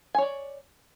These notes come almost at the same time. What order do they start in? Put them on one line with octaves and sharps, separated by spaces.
G#5 C#5 D5